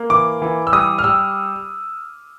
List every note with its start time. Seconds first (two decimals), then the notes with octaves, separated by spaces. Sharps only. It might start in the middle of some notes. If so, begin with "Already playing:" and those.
Already playing: A#3
0.10 E3 D6
0.42 E3
0.67 E6
0.72 G3 D#6
0.99 F6
1.04 G3 E6